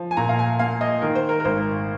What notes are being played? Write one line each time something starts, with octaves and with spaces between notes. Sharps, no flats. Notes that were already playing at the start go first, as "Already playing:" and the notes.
Already playing: F3
G#5
A#2 A#5
F5
G#5
A#3 F5
D#5
D#3 A#4
C5
A#4
A#4
G#1 C5